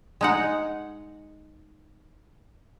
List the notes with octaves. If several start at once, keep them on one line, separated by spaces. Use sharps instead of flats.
G#3 D#4 F#5